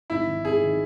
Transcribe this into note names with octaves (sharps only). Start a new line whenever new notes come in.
G#1 E4
D#3
G#1 G#4
D#3